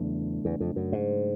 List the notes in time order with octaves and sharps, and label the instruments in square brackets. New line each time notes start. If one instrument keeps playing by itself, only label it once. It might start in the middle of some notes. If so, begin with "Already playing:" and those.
Already playing: [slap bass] E2 [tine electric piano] C#3 F#3 A3 D4
[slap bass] E2
F2
F#2
G#2